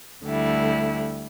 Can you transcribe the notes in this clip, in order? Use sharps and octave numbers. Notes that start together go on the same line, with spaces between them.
D2 D3 G3 E4